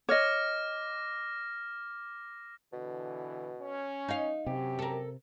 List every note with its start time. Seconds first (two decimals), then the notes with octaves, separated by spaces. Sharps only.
0.09 C#5 D#5 D6 F6 A#6
2.73 B2 D3 E3
3.59 C#4
4.08 D#4 F5
4.47 F#2 C3 G4
4.79 A4 A#4